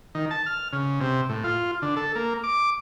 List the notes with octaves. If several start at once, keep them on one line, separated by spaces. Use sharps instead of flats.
D#3
A5
F6
C#3
C3
A2
F4
D3
A4
A#3
D6